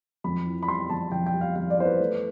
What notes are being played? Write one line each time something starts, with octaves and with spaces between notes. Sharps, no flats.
F2 B5
E3
B5
G3 C6
F2 A5
F2 G5
G5
G3
F5
F2 F5
D5
E3 C5
B4
A3